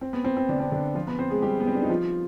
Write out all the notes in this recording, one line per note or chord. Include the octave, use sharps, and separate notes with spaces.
C4
B3
C4
C4
D3 D4
C4
D3 D4
F3 F4
B3 B4
C4 C5
G#3 G#4
G3 G4
B3
C4
D4
D#4
F3 F4